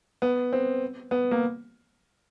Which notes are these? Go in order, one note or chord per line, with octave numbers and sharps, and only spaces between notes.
B3
C4
B3
A#3